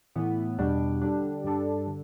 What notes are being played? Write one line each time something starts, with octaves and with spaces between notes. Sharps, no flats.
A2 E3 B3
E2 B2 G3 D4
D3 G3 D4
G2 G3 D4 A4
D3